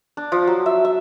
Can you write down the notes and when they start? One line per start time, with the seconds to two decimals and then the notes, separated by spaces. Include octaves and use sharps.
0.17 D4
0.32 F3
0.47 F#3
0.66 E5
0.85 E5